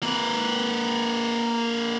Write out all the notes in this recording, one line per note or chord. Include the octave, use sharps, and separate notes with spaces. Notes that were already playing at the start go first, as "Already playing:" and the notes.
A#3 B4